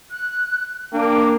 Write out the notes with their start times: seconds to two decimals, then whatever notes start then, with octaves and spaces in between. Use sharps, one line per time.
0.11 F#6
0.93 A#3 D4 G5